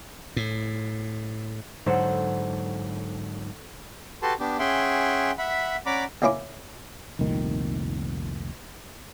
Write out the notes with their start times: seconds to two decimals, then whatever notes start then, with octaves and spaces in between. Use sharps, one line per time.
0.36 A2
1.86 G#2 D3 F#3 A4 C5 F#5
4.22 F#4 G4 A4 B4 A5 C6
4.40 B3 D4 G4
4.59 C#4 G#4 E5 F#5 G5 C6
5.38 E5 F#5 B5
5.86 C#4 D5 F#5 A#5 B5 D6
6.22 C#2 A#3 C#4 E4 D6
7.19 F1 C2 A#2 D#3